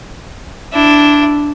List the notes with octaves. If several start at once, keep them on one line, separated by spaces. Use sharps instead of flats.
D4 E4